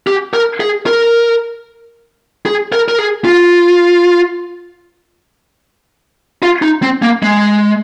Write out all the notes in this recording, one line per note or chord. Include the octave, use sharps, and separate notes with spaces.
G4
A#4
G#4
A#4
G#4
A#4
A#4
G#4
F4
F4
D#4
C4
A#3
G#3